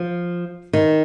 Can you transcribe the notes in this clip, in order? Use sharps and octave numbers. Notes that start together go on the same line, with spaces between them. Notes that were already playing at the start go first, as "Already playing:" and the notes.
Already playing: F3
D#3